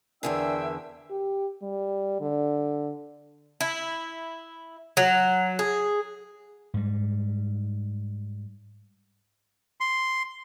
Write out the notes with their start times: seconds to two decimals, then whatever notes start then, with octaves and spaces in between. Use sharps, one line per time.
0.23 E2 D3 D4 G#4 A#4 E5 G5 E6
1.11 G4
1.63 G3
2.21 D3
3.61 E4
4.97 F#3
5.59 G#4
6.74 G#2 G3
9.80 C6